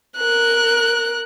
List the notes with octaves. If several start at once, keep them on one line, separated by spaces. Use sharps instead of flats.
A#4 F#6